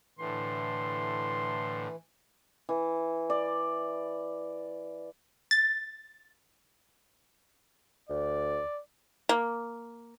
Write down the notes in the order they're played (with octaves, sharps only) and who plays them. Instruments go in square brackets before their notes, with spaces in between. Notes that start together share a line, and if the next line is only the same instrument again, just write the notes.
[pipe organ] A2 D3 [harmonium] E3 [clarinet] C6
[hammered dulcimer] E3
D5
[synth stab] A6
[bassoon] D2 [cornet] D5
[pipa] A#3